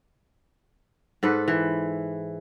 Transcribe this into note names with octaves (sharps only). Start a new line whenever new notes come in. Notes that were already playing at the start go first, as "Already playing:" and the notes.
G#2 A4 B4
E3